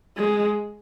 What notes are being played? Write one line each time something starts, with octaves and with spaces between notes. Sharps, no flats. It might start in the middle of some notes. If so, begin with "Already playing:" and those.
G#3